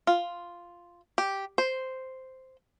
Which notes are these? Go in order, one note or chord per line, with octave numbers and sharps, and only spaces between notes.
F4
G4
C5